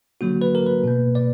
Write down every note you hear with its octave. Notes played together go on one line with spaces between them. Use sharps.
D3 F#3 A#3 F#4
B4
A#4
B4
B2 A#3
D5